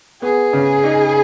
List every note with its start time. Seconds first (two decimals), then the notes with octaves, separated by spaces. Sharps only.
0.22 B3 G#4
0.53 C#3
0.84 D#4